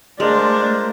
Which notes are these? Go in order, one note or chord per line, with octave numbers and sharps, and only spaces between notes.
G#3 A3 D4 F4 A#4 C5